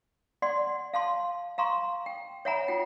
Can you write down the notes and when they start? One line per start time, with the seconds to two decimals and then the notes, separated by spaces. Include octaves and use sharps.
0.42 D5 F#5 C6
0.93 F5 A5 C6
1.58 F5 A#5 C6 C#6
2.06 G5
2.45 C#5 E5 F#5 G#5 A#5 B5
2.68 F4 F#5 G5